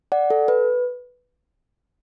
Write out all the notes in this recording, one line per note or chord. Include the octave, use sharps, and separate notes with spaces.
D5 F#5
A4
B4